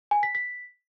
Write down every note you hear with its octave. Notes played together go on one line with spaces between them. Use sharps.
G#5
B6
B6